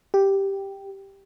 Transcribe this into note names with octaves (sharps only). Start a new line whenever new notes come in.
G4